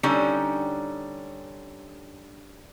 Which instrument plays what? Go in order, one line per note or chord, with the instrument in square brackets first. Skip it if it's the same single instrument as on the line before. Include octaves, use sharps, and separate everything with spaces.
[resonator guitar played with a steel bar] D3 G3 C#4 D#4 C#5